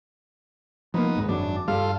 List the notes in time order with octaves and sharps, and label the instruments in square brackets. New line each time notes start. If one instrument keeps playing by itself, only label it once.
[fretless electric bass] F3 A#3 [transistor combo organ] B3 D#4
[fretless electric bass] D1 G#1 G#2
[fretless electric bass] G#1 F#2 F#3 [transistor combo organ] D4
[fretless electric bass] G2 G3 [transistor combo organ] F4 A4 F5